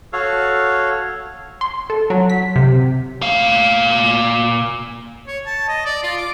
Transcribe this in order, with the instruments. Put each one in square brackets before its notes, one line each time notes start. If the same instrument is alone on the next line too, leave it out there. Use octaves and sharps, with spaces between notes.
[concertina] F#4 A4 C#5 F5
[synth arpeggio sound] C6
A4
F#3
B6
C3
[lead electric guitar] A#2 F5
[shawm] C#5
A5
D#5
D5
F4
D6